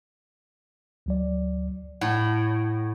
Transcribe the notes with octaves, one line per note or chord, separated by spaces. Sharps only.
D2 F#3 D5
A2 F#5